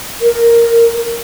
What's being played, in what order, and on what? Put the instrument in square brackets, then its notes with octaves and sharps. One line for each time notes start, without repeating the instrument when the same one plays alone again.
[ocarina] A#4